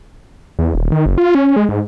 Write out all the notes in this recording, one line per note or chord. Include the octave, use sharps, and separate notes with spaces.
E2
D#1
D#3
F#1
F4
C#4
G#3
G#2